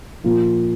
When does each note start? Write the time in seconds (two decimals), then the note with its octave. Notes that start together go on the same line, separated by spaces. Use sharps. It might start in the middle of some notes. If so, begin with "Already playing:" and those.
0.24 A#2 F3 A#3 F4